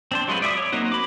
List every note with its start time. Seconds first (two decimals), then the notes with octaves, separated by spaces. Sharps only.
0.12 C4 D4 C5
0.28 F#3 G#3 C4 F4 B4
0.42 D5 E5 G#5 D#6
0.58 C#5
0.72 F#3 A#3 C4 D#4 F#4
0.92 B5 D6